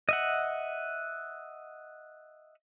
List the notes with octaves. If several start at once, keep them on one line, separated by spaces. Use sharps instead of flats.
D#5 E5 F#5